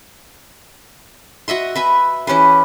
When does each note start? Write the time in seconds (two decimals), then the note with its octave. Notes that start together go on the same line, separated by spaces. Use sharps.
1.48 F#4 D#5 E5 C6
1.76 B4 E5 G#5
2.27 E3 C#4 G4 B4